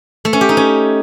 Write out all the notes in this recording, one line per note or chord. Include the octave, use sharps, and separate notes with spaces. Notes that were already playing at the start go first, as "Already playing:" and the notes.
A3
C#4
G4
D#4
C#4